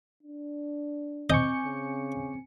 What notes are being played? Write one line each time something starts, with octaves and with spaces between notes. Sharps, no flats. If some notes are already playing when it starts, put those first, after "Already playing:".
D4
C4 D#5 G#5 C#6 D6 G6 C#7
C#3